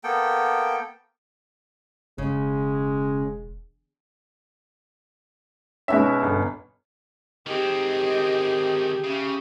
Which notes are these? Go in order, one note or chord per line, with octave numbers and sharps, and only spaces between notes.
A#3 B3 A4 G5
E1 C#3 G#3
B2 G#3 C#4 D#4 E5
G1
D#3 C4 G4 G#4 D#5
C#3 E5